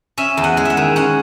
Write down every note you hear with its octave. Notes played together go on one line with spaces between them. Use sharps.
C#4 E5
E2
F#5
G#3
E5 F#5
D#3
C#4 F#5